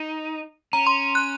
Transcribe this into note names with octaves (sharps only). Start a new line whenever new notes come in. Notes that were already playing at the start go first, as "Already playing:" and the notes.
Already playing: D#4
C#4 A#5
C6
F#6